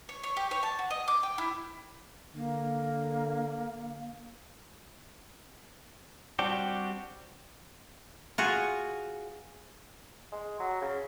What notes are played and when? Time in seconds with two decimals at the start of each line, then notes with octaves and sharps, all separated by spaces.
0.09 C#5
0.23 C#5
0.37 G4
0.51 C#5
0.63 A5
0.79 F#4
0.91 D#5
1.08 D6
1.23 G5
1.38 E4
2.35 D3 A#3
6.39 G3 C4 D4 F#4 G4
8.38 F4 F#4 G#4
10.32 G#3
10.60 F#3
10.81 C#3